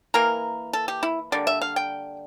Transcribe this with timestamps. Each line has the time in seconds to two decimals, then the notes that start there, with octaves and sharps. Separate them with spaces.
0.14 E3 A#3 A#4
0.73 A4
0.88 G4
1.03 E4
1.32 D3 G3 A#3 D5
1.47 E5
1.61 F5
1.76 G5